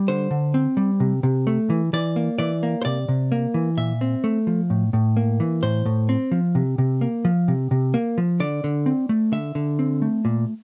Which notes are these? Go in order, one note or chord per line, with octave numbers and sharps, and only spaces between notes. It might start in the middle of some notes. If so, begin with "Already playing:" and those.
Already playing: G3
D3 C5
D3
C4
G3
C3
C3
A3
E3
E3 D5
A#3
E3 D5
A#3
C5
C3 D5
C3
A#3
E3
A#2 E5
C4
A3
F3
A2
A2
A#3
E3
A2 C5
A2
C4
F3
C3
C3
A#3
F3
C3
C3
A#3
F3
D3 D5
D3
C4
A3
D3 E5
D3
C4
A3
A#2